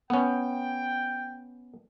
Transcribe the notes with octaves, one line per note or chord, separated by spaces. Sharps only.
B3 C#4 G5